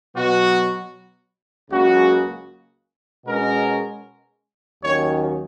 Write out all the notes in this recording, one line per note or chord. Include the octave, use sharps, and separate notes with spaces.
B2 F#3 B3 F#4
C#2 C#3 F#3 A#3 C#4 F#4
B2 G#3 C#4 A#4
D#2 D#3 F#3 C#4 C#5